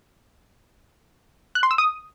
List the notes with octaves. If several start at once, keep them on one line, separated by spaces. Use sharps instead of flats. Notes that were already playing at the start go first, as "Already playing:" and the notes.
F#6
C6
E6
D#6